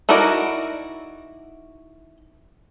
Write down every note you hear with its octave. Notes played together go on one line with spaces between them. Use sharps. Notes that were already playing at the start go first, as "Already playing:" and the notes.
D#4 E4 F#4 A#4 D5